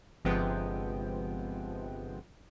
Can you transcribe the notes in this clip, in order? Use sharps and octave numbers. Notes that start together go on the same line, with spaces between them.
G1 C3 F3 G#3 B3 G5